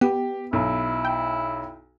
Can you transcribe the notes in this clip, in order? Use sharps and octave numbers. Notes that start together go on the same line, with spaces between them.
B3 G4
B1 E4
G5